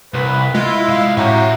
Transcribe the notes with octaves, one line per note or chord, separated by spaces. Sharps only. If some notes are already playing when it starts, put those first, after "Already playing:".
C2 B4
G#3 E4 F4
C2 F5
A2 C#4 F#4 G4 E5 A#5